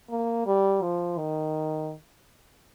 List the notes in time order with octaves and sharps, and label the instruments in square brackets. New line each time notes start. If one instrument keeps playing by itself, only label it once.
[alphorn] A#3
G3
F3
D#3